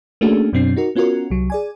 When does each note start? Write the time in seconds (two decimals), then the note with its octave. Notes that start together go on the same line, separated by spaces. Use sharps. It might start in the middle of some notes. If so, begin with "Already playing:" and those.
0.21 A3 A#3 C#4 D4 F#4 G#4
0.53 F#2 B2 F#3 C4 D4 C7
0.76 D#4 F#4 A#4
0.95 B3 C#4 F4 F#4 A#4
1.30 C2 F#3
1.50 G#4 D5 G#5